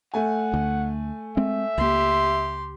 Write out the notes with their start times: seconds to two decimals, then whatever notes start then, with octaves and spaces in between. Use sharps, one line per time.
0.14 A3 F#5 G#5
0.54 D2
1.37 G#3 C4 E5
1.78 C#2 A#3 G4 C6